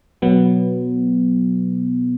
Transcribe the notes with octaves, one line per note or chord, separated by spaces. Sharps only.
B2 F#3 B3